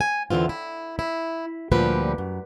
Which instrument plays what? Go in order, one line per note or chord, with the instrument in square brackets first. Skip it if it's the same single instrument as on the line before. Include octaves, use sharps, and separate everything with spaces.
[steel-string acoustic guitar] G#5
E2 D3 E3 C4 F4
E4
E4
D2 A#2 F3 G3 G4 B4
F#2